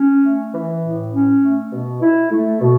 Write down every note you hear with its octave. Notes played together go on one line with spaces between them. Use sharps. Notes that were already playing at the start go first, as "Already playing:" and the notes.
Already playing: C#4
A3
E3
A2
C#4
A3
B2
E4
A3
B2